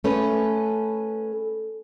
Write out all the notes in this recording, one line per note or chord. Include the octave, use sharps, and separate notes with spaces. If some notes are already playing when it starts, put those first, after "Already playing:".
A3 C#4 A4 B4